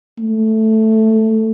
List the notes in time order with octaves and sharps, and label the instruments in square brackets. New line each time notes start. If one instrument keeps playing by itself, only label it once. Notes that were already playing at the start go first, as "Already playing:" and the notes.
[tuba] A3